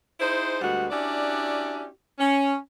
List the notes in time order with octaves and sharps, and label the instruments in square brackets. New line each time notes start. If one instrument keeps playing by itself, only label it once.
[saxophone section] D#4 E4 G#4 C5
D2 G3 G#3 B3 F#4 F#5
C#4 D4 E4 F#4 G4 D5
C#4